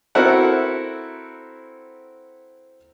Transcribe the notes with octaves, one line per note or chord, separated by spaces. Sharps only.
C4 E4 F#4 A4 A#4 F#5